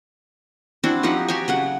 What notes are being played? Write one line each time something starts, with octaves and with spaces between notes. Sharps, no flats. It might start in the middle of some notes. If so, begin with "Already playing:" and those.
C4 D4 E4 F#4
F3 D#4 G4 F#5
F#4 G4 G5 G#5
C#3 F#3 F#5